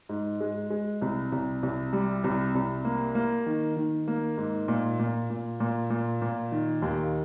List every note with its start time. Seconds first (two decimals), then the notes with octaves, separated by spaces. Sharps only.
0.09 G#2
0.40 G#3
0.70 G#3
1.02 C2
1.32 C2
1.63 C2
1.93 G3
2.24 C2
2.55 C2
2.85 A#3
3.15 A#3
3.46 D#3
3.76 D#3
4.08 A#3
4.38 G#2
4.68 A#2
4.99 A#2
5.30 A#2
5.60 A#2
5.90 A#2
6.22 A#2
6.52 D#3
6.82 D#2